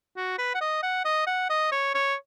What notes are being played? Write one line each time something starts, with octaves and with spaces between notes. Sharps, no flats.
F#4
B4
F#5
D#5
F#5
D#5
F#5
D#5
C#5
C#5